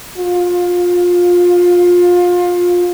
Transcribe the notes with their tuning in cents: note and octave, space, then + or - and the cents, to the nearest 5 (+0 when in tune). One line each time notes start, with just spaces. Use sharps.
F4 +25